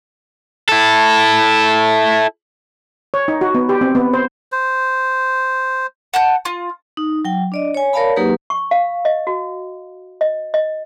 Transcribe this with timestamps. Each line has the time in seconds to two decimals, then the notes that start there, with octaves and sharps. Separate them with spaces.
0.69 E4 A4
3.14 C#5
3.28 D#4
3.41 F#4
3.55 B3
3.69 G4
3.81 C4
3.95 B3
4.13 C5
4.52 C5
6.14 F#5 A5 G6
6.45 F4
6.97 D#4
7.25 F#3 G5
7.52 D4 D5 D#5
7.74 C#5 G#5
7.93 A#4 C#5 D5 F5 A5 B5
8.16 F#3 A#3 D#4 G4 G#4 B4
8.50 C#6
8.71 F5
9.05 D#5
9.27 F#4
10.21 D#5
10.54 D#5